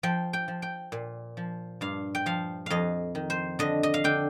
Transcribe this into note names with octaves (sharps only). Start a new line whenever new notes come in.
F3 G5
G5
F3
G5
A#2
F3
G2 F5
G5
F3 F5
F2 D#5 F5
D#3
C5
D3 D#5
D#5
F5
D3 G5